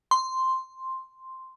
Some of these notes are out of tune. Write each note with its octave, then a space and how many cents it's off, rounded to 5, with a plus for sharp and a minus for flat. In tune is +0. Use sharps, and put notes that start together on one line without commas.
C6 +0